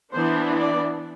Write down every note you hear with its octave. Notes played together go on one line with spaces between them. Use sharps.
E3 B3 D4 C5
D5